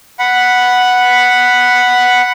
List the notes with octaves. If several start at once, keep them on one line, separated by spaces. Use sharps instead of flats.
F#5 B5